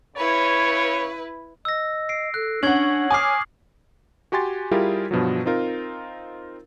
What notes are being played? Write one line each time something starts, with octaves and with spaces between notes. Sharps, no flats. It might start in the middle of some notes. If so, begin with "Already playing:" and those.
C#3 E4 B4 C#5
D#5 E6 A#6
C7 D7
A4 F#6
C#4 D4 F#5 C#6 G#6 F#7
C#5 G#5 D6 D#6 F6 C7
F#4 G4 G#5 C6 A6
G3 E4 F4 G4 G#4 A#4
G2 B2 F3 F#3
C4 D#4 F4 A#4